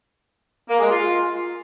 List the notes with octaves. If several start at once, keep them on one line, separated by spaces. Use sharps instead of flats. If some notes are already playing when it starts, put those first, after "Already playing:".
A#3
G#3
F4